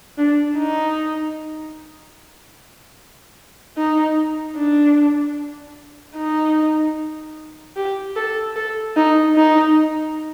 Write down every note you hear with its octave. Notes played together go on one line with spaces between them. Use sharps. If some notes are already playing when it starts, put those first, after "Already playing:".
D4
D#4
D#4
D4
D#4
G4
A4
A4
D#4
D#4